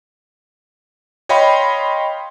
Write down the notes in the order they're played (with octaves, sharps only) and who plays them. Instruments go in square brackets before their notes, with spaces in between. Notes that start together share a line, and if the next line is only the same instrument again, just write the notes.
[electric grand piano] C#5 D#5 F5 G5 B5 C6